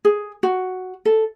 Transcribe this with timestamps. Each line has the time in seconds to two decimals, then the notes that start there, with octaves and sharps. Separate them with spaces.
0.05 G#4
0.43 F#4
1.05 A4